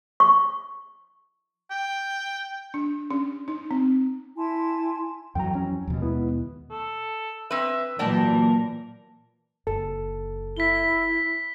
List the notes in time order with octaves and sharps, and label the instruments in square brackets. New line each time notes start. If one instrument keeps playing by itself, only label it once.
[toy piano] C#6
[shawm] G5
[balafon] D4
C#4
D#4
C4
[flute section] E4 G#5 A5 C6
[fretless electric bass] F2 E3 F#3 [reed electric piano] G5 A#5
[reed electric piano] C#4
[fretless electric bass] D#2 B2 [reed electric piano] F3
[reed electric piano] G#3 B3 E4
[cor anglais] A4
[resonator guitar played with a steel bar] C4 B4 [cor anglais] E5
[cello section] A#2 E3 F#3 [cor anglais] A#4 [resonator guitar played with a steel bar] D5 G5 A5
[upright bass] F#1 [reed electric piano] A4
[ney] E4 [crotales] B6 G7